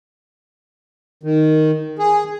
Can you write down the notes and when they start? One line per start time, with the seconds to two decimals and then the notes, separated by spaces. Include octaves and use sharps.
1.23 D#3
1.99 G#4